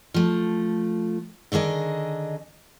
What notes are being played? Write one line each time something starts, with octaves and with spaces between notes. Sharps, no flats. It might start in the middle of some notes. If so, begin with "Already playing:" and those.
F3 A3
D3 D#3 D4 G#4 D#5